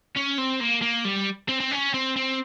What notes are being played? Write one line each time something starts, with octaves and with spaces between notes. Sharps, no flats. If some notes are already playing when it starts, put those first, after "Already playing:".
C#4
C4
A#3
A#3
G3
C4
C4
C#4
C4
C4